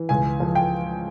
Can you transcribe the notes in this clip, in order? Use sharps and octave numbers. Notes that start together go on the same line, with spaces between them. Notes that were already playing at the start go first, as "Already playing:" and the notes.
Already playing: E3
C#2 G#5
F3
G5